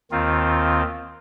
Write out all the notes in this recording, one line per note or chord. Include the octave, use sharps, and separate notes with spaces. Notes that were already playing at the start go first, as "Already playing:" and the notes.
D#2 D#3 C4 F4